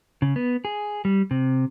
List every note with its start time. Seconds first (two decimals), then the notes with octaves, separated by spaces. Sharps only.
0.22 C#3
0.36 B3
0.65 G#4
1.05 G3
1.31 C3